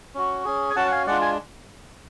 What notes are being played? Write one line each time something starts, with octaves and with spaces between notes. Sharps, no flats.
C#4 F#4
C#4 G#4
G#5
C#4 F#4 F#5 A5
F#5
F5 G#5
G#3 D4 F4 D5 F#5
G#5